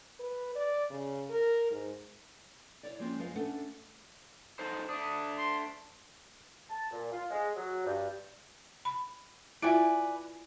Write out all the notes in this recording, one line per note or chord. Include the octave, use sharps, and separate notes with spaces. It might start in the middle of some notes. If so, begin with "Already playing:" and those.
B4
D5
C#3
A#4
G#2
E4 C#5 D5
F3 G#3 A#3 C4 C#4
F#2 F3 G#3 B4 D#5 F5
A3 C#4 D4 A4 E5 F#5
D#4 A4 C5
A3 D4 D#6
C6
A5
A#2
F4
G#3
F#3
G2
B5
E4 F4 B4 D5 E5 G#5